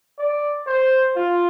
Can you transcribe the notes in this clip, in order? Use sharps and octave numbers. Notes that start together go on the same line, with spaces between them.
D5
C5
F4